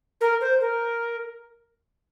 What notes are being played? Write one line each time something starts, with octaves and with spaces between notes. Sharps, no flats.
A#4
C5
A#4